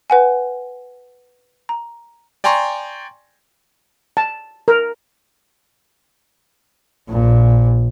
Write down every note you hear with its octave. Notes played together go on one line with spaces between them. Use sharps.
B4 F#5 G#5
A#5
D5 G5 G#5 A#5 C6 C#6
A5
A#4
A#1 A#2